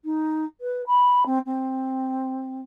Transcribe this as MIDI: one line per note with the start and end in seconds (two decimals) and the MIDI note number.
0.04 0.45 63
0.61 0.82 71
0.87 1.24 83
1.26 1.39 60
1.46 2.61 60